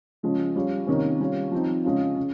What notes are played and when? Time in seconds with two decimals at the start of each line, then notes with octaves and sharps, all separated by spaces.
0.23 C#3 F3 G#3 C#4
0.55 G3 C#4 F4
0.87 C3 D#3 A#3 C#4
1.20 G3 C#4 F4
1.52 F3 C4 D#4
1.84 C#3 G#3 C#4 F4
2.16 C#3